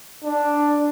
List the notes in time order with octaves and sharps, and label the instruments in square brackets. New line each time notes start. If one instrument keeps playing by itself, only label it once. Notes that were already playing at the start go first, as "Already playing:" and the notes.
[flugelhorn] D4